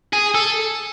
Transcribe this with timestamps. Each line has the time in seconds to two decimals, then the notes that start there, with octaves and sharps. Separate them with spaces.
0.13 G#4
0.34 A4